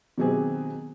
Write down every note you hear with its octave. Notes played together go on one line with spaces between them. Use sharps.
B2 D#3 F#3 C4 G4 G#4